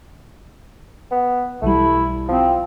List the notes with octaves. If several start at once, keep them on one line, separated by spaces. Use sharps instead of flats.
B3
B1 E3 G3 A3 E4
F3 C4